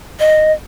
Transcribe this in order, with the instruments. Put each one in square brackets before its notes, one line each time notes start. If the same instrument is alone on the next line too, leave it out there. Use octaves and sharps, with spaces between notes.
[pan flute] D#5